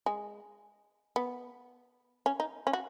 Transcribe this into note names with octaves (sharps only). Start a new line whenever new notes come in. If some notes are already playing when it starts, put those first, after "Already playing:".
G#3
B3
C#4
D#4
C#4
F#4